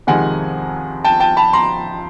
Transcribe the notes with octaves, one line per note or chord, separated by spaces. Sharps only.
F2 C3 D#3 G#3 F#5 G#5
G5 A5
G5 A5
A5 B5
A#5 C6